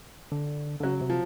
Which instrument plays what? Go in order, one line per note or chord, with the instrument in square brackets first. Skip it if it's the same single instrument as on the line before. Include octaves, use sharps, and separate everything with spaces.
[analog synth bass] D3
D3
[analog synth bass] C#3 [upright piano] F#3
[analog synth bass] C3
[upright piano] F3